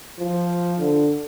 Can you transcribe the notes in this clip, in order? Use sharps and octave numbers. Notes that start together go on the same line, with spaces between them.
F3
D3